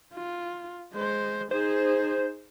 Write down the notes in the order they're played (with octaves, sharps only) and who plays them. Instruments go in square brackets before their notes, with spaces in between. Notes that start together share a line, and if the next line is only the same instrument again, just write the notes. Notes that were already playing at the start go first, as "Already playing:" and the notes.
[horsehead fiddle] F4
G#3 C5
[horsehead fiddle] D#4 G#4 [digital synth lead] C5